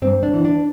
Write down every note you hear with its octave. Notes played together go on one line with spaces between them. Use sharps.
G2 C4
D4
E3
D4